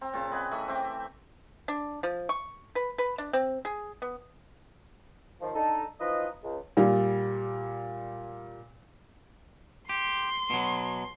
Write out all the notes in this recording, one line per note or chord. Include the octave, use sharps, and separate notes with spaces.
C4 A#5
A#2 C#3 C4 A5
B4 D#5 F#5 G#5
E3 A3 D#5 E5
C4 E5 G5 D6
D4
F3
C#6
B4
B4
D4
C4
G#4
B3
D#2 D#3 F3
D4 D#4 A4
E3 F3 D#4 F4 B4 D#5
C#2
A#2 G3
G4 C6
B2 F#3